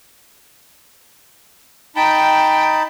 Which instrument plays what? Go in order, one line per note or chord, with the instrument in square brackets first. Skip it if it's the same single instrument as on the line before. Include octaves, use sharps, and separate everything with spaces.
[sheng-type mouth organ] D#4 A5 B5 [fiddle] G5